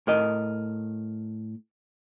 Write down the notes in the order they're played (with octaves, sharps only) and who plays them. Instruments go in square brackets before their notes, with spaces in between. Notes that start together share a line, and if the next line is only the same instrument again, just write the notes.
[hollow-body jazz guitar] A2 A#4 D#5